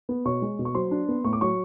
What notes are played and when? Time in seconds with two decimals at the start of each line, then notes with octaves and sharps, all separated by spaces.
0.09 B3
0.25 B2 C#5 C#6
0.42 G#3
0.59 B2
0.65 C#6
0.75 F#3 C5 C6
0.91 D4
1.09 B3
1.24 A2 C#6
1.33 D6
1.41 F#3 C#5 C#6